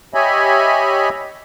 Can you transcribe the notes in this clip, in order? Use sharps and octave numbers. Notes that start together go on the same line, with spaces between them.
G4 C#5 D#5 E5 G#5 B5